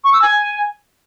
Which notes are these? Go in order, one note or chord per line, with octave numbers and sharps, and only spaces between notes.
C#6
E6
G#5